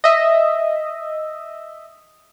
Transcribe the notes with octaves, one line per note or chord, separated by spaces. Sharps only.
D#5 E5